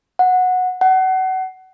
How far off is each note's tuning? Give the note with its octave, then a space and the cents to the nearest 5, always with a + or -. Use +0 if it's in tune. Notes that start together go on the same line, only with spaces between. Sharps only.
F#5 -15
F#5 +30